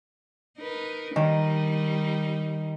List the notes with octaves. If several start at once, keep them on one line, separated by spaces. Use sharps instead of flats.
D#4 A#4 B4
D#3 G3 D#4